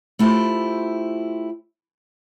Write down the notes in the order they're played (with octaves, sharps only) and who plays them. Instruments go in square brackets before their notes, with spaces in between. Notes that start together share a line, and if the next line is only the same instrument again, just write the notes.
[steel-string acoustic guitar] A3 E4 F4 G4 C5